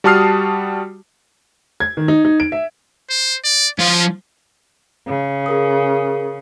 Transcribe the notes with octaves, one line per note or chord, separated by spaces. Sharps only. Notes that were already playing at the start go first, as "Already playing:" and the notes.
G3 F#4 A5 D#6 F6 C7
G#6
D#3
D#4
D#4
D7
E5
C5
D5
F3 C#4 C5
C#3
G#4 A#4 D#6